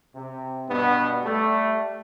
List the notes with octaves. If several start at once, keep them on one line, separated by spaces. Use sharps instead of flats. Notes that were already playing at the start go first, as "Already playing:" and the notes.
C3
G2 B2 B3
G3 A3